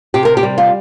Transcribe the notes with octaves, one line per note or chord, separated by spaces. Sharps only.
C3 G4
A#4
G4
G3
F4